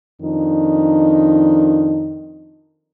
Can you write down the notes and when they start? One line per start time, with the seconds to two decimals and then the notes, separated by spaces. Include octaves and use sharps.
0.21 F2 D#3 D4 D#4